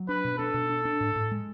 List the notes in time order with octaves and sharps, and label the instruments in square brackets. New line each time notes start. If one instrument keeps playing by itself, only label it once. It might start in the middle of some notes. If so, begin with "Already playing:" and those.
Already playing: [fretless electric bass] F#3
[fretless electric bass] D4 [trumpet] B4
[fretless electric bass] B2
[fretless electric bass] D4 [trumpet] A4
[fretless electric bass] B2
D4
D4
A2
A2
G#3